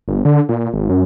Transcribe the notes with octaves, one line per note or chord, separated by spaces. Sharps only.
G1
D3
A#2
G#1
F#2